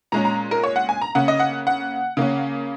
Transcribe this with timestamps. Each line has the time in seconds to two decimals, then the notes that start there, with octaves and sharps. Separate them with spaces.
0.12 A#2 G#3 C#4 A#5
0.25 A#5
0.51 A#4
0.63 C#5
0.76 F#5
0.89 G#5
1.01 A#5
1.15 C#3 A#3 C#4 F#5
1.28 D#5
1.40 F#5
1.67 F#5
2.17 C#3 A#3 C#4